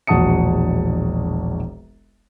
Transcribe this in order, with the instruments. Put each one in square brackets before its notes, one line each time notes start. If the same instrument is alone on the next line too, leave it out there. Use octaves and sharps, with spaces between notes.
[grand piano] E1 A#1 F#4 A5 D#6 C#7